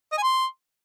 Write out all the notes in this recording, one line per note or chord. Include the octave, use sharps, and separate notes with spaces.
D#5
G#5
C6